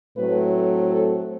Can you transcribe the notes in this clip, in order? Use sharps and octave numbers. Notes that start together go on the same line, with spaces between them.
A2 F#3 A3 C4 B4
A4